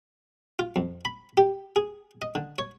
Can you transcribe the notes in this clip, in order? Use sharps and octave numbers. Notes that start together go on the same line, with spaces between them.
F4
F2
B5
G4
G#4
D#5
D3
C#5